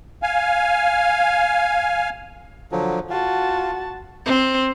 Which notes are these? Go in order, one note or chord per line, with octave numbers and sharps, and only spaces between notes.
F5 G#5
D3 F3 F#3
F4 F#4 A5
C4